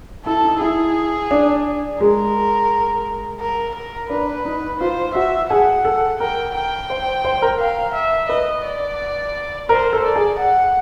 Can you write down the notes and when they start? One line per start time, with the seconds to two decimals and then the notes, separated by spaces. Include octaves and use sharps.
0.25 E4 A4
0.44 D#4
0.61 E4 G#4
1.31 D4
2.00 G#3 A#4
3.40 A#4
3.75 A#4
4.10 D4 B4
4.45 D#4
4.80 F4 C5
5.15 F#4 E5
5.50 G#4 F#5
5.85 A4
6.19 A#4 G5
6.55 G5
6.90 C5
7.25 C5
7.42 A#4
7.60 F5
7.94 E5
8.29 B4 D#5
8.65 D5
9.69 A#4 C5
9.93 A4
10.04 D5
10.16 G#4
10.39 F#5